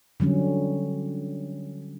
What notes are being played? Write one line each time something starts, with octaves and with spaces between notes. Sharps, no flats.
D3 F#3 G3 C#4